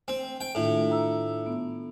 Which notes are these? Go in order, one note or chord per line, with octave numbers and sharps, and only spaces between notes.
C4
G5
A2 D#3 D4 F4
E5 A#5 E6
B3